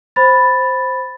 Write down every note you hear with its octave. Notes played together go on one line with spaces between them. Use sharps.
C5 B5 A6